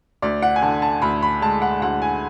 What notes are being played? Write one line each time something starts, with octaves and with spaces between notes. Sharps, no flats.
D2 D5
F#5
G#5
D3 A5
A5
D2 B5
B5
G#3 A5
F#5
D2 F#5
G#5